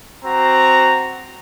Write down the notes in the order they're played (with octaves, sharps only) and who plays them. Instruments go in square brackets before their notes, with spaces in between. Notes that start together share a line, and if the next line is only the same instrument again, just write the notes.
[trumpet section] C4 F#4 A#5